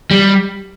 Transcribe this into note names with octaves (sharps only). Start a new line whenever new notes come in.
G3